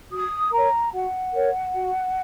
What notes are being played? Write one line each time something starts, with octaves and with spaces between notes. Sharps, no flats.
F#4 D#6
A#4 C#5 A#5
F#4 F#5
A#4 C#5
F#4